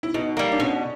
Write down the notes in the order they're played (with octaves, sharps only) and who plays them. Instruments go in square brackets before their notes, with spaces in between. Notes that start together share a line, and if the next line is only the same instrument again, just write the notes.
[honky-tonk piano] E4
[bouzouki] B2 [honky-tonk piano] D#4
[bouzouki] G3 A#3
[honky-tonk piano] D4
[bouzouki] B2 [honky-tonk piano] C#4